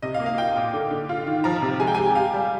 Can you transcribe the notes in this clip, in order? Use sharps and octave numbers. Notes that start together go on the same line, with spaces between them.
C3 D#5
F5
A#3
F5
F4 G5
A#2
D3
D3
F4
D#3
F3 A#5
C3
G#3 G#5
G5
G4 G#5
G4 F5
G3